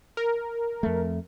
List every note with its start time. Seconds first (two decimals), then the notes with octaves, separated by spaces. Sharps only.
0.17 A#4
0.83 F2 A3